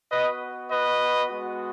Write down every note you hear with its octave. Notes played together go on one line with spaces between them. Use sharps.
B3 F#4 B4 D#5
B4 D#5
G#3 B3 F#4